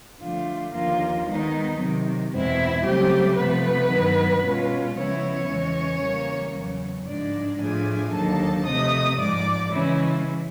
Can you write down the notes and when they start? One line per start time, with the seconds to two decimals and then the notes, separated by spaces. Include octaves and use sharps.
0.20 D3 F3 A3 D4 F4
0.73 D#2 D3 F3 A#3 F4
1.26 D#3 G#3 B3 D#4
1.79 C3 D#3 F#3
2.31 E2 B2 G#3 C4 E4
2.85 C#3 F#3 G3 A3 C4 G4
3.37 C3 F3 A3 B3 B4
3.91 G2 D#3 F#3
4.44 B2 G#3 C#4 F4
4.96 C#3 F3 G#3 B3 C#4 E4 C#5
5.50 E2 C#3 E3 G#3
6.01 C#3 E3 G3 A#3
6.54 E2 C#3 F#3
7.07 G#2 F3 G#3 D4 D5
7.60 A2 F3 A3 D4 F4 G#4 G#5
8.13 D#2 D3 F#3 A#3 D#4 A4 A5
8.66 C3 F3 A3 D#5 D#6
9.19 G#2 F3 G#3 D5 D6
9.71 C#3 E3 G#3 C#4 E4